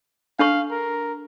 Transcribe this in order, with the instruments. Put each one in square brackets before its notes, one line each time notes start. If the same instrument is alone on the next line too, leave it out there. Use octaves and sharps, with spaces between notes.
[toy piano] D4 A4 C#6 [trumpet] F5
[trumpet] A#4